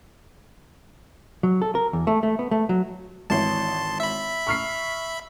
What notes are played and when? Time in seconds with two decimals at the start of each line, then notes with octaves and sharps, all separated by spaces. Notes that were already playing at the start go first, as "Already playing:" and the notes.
1.43 F#3
1.62 A4
1.75 A#4
1.93 E2
2.07 A3
2.23 A3
2.39 B3
2.51 A3
2.69 F#3
3.30 G#1 E3 C#5 A5 C6
4.00 E5 B5
4.47 C#6 F6 C7